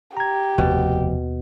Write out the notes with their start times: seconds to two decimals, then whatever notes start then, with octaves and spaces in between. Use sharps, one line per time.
0.17 G4 A#5 G#6
0.58 F1 D#2 B2